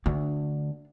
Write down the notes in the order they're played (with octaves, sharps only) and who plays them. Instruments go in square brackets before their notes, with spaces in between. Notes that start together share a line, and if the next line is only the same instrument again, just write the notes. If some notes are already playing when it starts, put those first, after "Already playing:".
[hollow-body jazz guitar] D2 [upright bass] D4